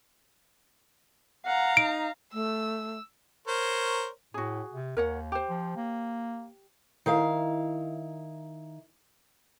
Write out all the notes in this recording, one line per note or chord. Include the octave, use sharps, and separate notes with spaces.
F5 F#5 A#5
D#4 D7
A3 E6
A#4 C5 C#5
A2 F#4 G#4
C3
D#2 A#4 C#5 F#5
G4 C5
F3
A#3
D#3 E4 F5